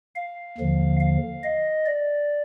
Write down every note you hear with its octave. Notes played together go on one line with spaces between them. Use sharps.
F5
D#2 D3 F3
F5
D#5
D5